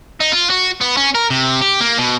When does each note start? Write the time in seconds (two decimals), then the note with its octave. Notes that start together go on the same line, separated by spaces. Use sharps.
0.20 D#4
0.32 F4
0.50 F#4
0.81 B3
0.97 C#4
1.15 A#4
1.30 C3
1.61 G4
1.80 A#3
1.98 B2